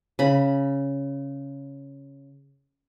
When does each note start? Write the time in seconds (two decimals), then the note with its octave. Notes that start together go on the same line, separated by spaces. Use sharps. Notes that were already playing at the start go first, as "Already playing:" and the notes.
0.19 C#3 B5